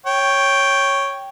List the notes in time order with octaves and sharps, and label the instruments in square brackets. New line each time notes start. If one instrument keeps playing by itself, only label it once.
[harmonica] C#5 G5